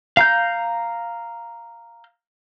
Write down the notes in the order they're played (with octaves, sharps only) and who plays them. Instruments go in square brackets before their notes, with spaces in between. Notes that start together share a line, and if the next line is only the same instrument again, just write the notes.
[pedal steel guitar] F5 A#5 G6